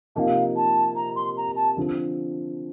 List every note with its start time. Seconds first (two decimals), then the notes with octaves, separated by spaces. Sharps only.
0.16 C3 F3 A#3 D#4 F5 A5
0.56 A5
0.96 A#5
1.16 C6
1.37 A#5
1.56 A5
1.77 D3 F3 C4